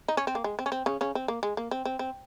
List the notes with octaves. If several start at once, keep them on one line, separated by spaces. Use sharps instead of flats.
D#4
C#4
C4
A#3
G#3
C4
C#4
C4
C#3 C#4
C#3 C#4
C4
A#3
G#3
A#3
C4
C4
C4